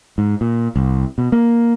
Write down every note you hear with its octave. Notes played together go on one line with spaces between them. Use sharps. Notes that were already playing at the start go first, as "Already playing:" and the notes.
G#2
A#2
C2
B2
A#3